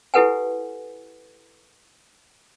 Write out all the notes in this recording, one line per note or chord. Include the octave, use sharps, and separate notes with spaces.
E4 G4 A4 B4 F#5 G#5